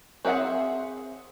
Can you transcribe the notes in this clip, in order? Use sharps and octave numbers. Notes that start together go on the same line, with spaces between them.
C4 G#4 E5 F#5